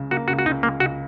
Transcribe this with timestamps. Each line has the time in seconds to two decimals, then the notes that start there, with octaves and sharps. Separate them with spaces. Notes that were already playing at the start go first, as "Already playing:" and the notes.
Already playing: C#2 C#3
0.11 A#3 F#4
0.28 C#2 F#4
0.39 F#4
0.46 C#2 D#4
0.63 C#2 A#3
0.80 C#2 F#4